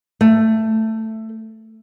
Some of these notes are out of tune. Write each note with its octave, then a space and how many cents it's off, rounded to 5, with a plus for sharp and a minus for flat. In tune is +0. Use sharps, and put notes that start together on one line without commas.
A3 +10